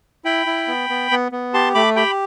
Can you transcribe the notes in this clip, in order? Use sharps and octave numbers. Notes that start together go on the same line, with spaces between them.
E4 G5 B5
E4
B3
B3
B3
B3
G4 A5 C6
A3 B5 D6
G4 G5 B5